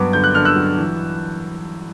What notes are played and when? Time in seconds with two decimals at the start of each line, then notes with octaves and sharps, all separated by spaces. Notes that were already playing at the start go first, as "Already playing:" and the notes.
Already playing: G2 F#3 B3 D6
0.13 D3 G6
0.24 F#6
0.34 D3 F6
0.45 E6 F#6
0.55 F#3
0.78 E3